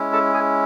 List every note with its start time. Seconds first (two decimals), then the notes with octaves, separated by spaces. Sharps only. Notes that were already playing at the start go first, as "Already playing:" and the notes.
Already playing: G#3 C#4 E4
0.13 A4 A5
0.33 G#4 G#5